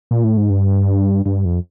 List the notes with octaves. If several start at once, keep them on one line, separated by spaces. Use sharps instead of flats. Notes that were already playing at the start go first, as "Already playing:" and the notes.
A#2
A2
G#2
G2
G2
F2